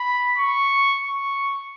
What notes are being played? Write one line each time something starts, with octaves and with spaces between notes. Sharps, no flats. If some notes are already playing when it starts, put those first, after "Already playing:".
Already playing: B5
C#6
C#6